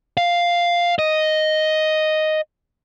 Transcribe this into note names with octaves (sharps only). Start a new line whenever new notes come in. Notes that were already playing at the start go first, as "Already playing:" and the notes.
F5
D#5